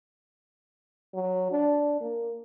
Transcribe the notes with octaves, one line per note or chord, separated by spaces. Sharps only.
F#3
D4
A#3